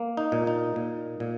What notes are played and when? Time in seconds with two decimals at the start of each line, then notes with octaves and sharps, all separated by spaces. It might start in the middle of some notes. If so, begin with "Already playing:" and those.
Already playing: A#3
0.17 D#4
0.32 A#2
0.47 D#4
0.76 A#2
1.20 A#2